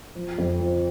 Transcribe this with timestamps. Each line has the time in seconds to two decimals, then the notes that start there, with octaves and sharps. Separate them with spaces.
0.15 F3
0.38 F2
0.60 F3